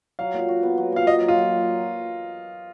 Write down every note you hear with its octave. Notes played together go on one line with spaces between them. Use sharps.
F#3 F5
A#2
F#4
B3
F#3
A#2 F5
A#3 D#5
F#3
F4
F#3